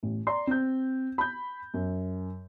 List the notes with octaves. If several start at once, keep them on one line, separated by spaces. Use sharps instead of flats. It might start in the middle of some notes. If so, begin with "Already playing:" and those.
A1
D5 A#5 C6
C4 G6
B5 G6
F#2